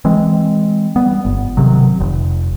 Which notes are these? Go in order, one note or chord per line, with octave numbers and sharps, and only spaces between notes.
E3 G#3 C4
G3 B3
G1
C3 D#3 F#3
F1